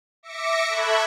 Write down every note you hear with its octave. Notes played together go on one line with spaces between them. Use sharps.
E5 D6 A#6 C#7
A4 E5 B5 C#6 F#6 G#6